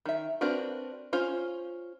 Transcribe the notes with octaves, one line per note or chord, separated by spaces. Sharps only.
D#3 E5
C4 D4 F#4 A#4 B4
C#4 F4 C5